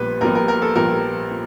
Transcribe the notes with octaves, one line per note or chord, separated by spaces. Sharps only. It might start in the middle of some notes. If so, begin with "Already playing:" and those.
Already playing: A#1 A#2 G3 B3 B4
A#1 A#2 G3 B3 A#4
A#4
A#4
A4
A#1 A#2 G3 B3 A#4
A#2